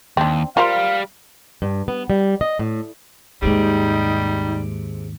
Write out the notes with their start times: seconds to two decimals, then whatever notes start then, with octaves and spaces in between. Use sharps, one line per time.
0.17 D#2 C4 D4
0.57 G3 F4 A#4 C5 F5
1.62 G2
1.88 B3
2.10 G3
2.41 D#5
2.59 A2
3.42 D#2 G#2 C3 G3 G#3 D#4